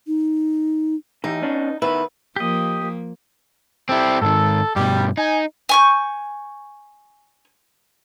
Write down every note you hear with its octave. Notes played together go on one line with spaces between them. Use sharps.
D#4
E3 D#4 G4
B3 C#4 D4
D#3 B3 E4 B4
F3 A#3 G4 D#5
C4 E4 G4 A4
G#2 D#3 A4
G2 B2 G3
D#4 G#5
G#5 C#6 G6